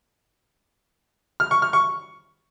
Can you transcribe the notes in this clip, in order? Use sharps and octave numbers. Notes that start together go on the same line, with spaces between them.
F6
C#6
F6
C#6